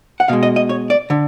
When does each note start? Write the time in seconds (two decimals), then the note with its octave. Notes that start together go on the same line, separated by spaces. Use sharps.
0.20 F#5
0.28 B2 G#3 F5
0.43 D#5
0.56 D#5
0.69 C#5
0.90 D5
1.10 D3